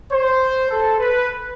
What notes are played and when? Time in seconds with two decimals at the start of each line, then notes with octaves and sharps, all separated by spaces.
0.13 C5
0.70 A4
0.99 B4